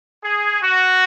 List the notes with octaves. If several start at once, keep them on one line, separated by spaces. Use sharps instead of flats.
G#4
F#4